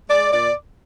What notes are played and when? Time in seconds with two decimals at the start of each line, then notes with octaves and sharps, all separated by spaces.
0.10 G#3 D5
0.32 A#2 D5